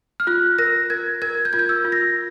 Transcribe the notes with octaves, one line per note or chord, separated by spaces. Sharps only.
F6
F4 F#6
A#4 A#6
A#4 G#6
A#4 G#6
G6
F4 G#6
G6
E6
F4
A#6